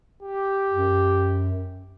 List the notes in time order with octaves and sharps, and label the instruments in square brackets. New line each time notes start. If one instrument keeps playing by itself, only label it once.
[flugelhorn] G4
[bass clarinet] F#2